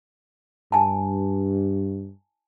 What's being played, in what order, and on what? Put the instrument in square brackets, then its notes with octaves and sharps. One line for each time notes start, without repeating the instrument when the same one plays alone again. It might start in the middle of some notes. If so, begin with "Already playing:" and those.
[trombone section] G2 [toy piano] G#5 A5